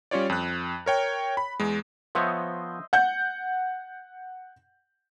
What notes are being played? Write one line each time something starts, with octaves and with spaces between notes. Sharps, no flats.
G3 C#4 F4 C#5 D5
F2 F#6
A#4 C#5 G5
B5
E2 G#3
F3 B3 C5 C#5 D#5 E5
F#5 G6